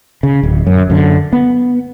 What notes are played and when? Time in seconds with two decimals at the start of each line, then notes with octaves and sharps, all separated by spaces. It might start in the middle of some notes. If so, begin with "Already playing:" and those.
0.23 C#3
0.43 D1
0.67 F#2
0.90 F#2 D3
1.33 B3